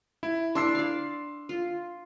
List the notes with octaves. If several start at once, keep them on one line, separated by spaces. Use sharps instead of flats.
E4
D4 E4 C6 E6 C7
D5 F5
F4